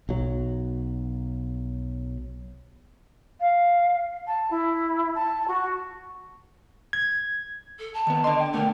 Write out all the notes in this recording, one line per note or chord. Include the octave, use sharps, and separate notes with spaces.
B1 F#3
F5
A5
E4
A5
F#4
G#6
A4
A5
D#3 B3
D3 D#5 C6
G5
B2 D3 A3 A#4